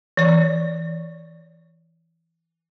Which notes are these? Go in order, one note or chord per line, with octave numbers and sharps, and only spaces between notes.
E3 D5